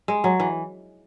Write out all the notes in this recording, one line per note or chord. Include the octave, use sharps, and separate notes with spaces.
G#3
F#3
E3